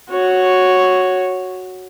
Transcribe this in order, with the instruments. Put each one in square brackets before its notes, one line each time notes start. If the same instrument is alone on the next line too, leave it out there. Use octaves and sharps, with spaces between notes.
[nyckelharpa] F#4 C#5